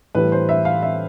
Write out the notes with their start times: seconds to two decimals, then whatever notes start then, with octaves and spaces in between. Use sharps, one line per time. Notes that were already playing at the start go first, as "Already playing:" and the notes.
0.15 A2 E3 G3 B4
0.32 C5
0.49 E5
0.65 F5
0.83 E5